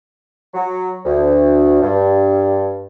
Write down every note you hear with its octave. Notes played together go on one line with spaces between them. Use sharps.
F#3
D2
G2